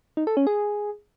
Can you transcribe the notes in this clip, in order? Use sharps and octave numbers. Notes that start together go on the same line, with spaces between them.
D#4
A4
C#4
G#4